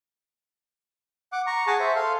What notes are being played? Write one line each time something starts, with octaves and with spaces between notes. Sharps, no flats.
F#5 D6
A#5 C#6
G#4 F#5 G#5 A5 C#6
C5 E5
A4 F5 C6